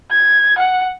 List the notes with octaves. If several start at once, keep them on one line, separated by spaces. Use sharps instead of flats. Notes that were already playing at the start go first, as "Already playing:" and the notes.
G#6
F#5